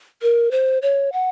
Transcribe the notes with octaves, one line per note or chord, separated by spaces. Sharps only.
A#4
C5
C#5
F#5